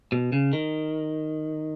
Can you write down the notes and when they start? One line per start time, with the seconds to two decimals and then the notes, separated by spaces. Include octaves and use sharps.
0.12 B2
0.32 C#3
0.53 D#3